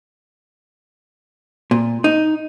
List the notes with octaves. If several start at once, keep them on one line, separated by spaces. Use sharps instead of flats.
A#2
D#4